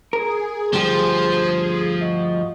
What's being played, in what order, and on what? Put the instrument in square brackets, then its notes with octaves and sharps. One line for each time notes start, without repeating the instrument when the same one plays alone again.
[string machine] G#4 [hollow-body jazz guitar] A#4
[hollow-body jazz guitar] D2 G2 G4 [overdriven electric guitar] F3 [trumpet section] C5
[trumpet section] F#4 D#5